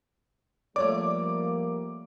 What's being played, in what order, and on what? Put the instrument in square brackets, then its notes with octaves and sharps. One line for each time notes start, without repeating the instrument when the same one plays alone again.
[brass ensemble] F3 G3 A#3 [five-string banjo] A3 C#5 D5 [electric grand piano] D6